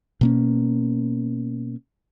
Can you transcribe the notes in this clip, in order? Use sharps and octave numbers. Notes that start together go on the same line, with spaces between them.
B2 A#3 C#4